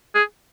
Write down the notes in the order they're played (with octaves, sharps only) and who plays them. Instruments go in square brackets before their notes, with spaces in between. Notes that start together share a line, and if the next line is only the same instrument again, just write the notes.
[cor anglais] G#4